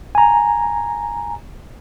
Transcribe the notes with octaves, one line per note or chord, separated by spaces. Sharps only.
G#5 A#5